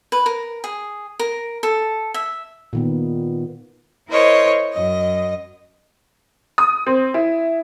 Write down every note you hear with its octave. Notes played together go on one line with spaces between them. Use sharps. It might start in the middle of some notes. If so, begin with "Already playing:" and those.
B4
A#4
G#4
A#4
A4
E5
A#2 D#3 B3
E4 A#4 C5 C#5 D#5
F#2 D#5
D#6
C4
E4